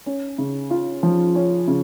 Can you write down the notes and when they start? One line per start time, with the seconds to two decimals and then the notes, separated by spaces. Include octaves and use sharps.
0.06 C#4
0.38 C#3
0.70 F4
1.03 F3
1.35 C#4
1.68 C#3